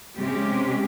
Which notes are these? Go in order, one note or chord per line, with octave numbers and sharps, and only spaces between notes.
C3 G#3 C#4 G4